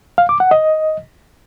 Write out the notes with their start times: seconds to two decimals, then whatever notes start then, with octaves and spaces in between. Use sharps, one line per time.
0.18 F5
0.29 D6
0.40 F#5
0.51 D#5